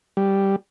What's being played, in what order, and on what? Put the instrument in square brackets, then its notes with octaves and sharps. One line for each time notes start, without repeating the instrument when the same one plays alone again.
[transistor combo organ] G3